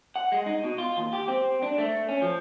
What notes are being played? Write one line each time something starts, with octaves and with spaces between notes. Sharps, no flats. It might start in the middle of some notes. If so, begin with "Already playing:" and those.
F#5
G#3
D#4
B2
F4
D#2
G4
C4
D4
A3
C#4
F3